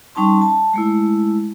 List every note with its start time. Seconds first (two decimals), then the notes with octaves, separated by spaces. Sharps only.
0.15 G3 C#4 D#4 A5 C6
0.42 A5
0.74 G#3 A3 E4